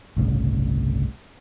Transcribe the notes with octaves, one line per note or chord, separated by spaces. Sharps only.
G1 C2 A2 C#3